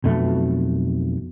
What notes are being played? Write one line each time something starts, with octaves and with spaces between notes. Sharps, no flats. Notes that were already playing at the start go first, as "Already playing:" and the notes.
B1 F2 B2 A3